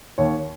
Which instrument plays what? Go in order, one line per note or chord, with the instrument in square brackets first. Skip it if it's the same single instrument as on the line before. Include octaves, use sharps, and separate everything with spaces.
[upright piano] D#2 C#5